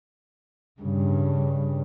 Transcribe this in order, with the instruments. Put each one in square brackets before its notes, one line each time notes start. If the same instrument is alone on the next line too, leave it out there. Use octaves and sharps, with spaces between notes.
[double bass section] G2 C#3